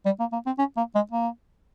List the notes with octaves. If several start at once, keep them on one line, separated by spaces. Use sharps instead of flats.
G3
A#3
A#3
C4
C#4
A#3
G#3
A#3